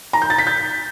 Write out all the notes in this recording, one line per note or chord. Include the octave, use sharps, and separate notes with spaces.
A#5
G6
A6
B6
G6